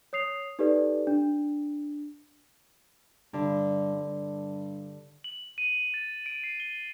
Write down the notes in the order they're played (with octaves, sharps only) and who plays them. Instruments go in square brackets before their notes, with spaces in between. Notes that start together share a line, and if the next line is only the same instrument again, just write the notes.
[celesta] C#5 D#6 C7 F7
D#4 G4 A4 B4 D5
D4
[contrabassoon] G2 [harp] D3
[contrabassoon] G2
[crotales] F#7
D#7
A6
D7
C7
G7